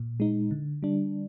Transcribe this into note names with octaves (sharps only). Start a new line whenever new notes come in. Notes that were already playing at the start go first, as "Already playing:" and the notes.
Already playing: A#2
G#3 D#4
D3
G3 D4